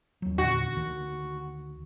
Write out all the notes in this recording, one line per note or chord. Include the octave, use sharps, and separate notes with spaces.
D#2 F#3
E2 A#2 D3 F#4
D2 D#3